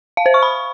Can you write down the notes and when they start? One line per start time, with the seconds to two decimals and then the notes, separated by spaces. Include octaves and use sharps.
0.17 F5
0.26 C5
0.34 C#6
0.43 B5